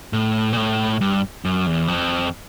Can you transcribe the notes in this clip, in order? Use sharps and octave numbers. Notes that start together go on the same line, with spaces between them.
A2
A#2
A2
G2
F#2
E2
F2